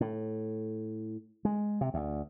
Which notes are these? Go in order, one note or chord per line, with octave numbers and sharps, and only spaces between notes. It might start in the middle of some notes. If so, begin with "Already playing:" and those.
A2
G#3
C3
D2